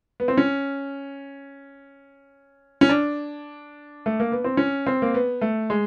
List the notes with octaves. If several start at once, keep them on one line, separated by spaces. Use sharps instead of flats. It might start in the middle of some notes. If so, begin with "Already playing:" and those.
B3
C4
C#4
C#4
D4
A3
A#3
B3
C4
C#4
C4
A#3
B3
A3
G#3